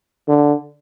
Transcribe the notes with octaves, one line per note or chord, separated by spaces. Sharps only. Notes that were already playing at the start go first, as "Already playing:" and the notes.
D3